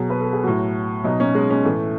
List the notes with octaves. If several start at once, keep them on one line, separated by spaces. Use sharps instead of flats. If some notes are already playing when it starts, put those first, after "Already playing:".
Already playing: B2 F#3 G#4
B4
A4
G#4
A2 F#3 F#4
B2 F#3 D#4
C#4
G#3
C#4
A2 E3 A3